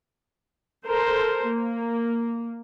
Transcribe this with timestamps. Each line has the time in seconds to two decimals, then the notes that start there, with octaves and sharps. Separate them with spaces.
0.84 A4 A#4 C5
1.47 A#3